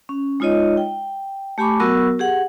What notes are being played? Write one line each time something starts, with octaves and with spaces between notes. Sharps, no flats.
C#4
G#3 D#4 F4 C#5 D#5
G5
A3 G4 G#5 B5 C#6 D6
F#3 B3 F#4 A#4 C#6 E6
G4 G#4 F#5